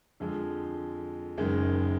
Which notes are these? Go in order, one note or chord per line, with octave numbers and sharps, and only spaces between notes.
F2 D3 F3 G#3
F#1 F#2 D#3 G#3